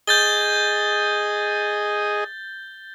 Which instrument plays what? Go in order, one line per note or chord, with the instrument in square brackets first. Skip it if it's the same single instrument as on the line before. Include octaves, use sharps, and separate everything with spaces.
[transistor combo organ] G#4 D#5 [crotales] G6 A6 G7